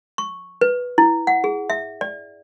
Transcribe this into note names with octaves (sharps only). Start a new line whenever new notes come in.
C#6
B4
E4
F#5
G#4
E5
D5